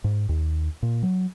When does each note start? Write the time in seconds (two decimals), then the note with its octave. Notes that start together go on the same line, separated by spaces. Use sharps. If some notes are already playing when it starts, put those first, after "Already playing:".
0.04 G#2
0.29 D#2
0.83 A#2
1.03 F#3